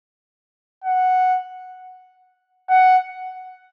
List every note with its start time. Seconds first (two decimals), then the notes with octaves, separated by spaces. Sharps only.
0.84 F#5
2.70 F#5